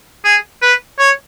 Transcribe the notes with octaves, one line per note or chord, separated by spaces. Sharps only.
G#4
B4
C#5